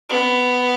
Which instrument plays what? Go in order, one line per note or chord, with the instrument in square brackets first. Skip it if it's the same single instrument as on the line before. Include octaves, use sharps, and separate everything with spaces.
[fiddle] B3